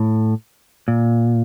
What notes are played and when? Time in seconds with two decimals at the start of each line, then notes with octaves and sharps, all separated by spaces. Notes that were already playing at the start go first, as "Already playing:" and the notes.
Already playing: A2
0.88 A#2